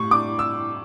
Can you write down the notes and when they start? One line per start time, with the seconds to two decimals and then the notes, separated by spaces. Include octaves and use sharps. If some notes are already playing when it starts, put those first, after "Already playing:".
Already playing: A2 G3 C#6
0.11 D4 D6
0.39 E6